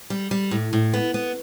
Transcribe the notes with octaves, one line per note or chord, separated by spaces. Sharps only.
G3
G3
A2
A2
B3
B3